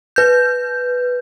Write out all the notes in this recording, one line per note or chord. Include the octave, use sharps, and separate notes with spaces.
B4 G6